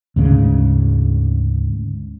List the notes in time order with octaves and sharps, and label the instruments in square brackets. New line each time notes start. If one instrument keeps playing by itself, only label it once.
[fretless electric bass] D2 G#2 C#3